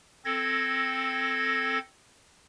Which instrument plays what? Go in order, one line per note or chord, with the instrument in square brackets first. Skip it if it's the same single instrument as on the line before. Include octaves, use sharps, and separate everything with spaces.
[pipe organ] C4 A4 G#6 A#6